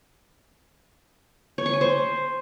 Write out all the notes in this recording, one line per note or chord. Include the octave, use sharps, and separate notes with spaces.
C#5
C#6
G#5
C5